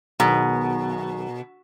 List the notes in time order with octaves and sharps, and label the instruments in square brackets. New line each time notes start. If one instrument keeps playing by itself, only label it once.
[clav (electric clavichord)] B1 D#3 G#4 [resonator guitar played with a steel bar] B2 [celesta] A#5